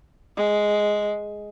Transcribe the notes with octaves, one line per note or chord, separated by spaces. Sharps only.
G#3